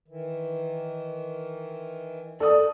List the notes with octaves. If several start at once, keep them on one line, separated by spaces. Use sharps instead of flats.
D#3 E3
A4 D5 D#6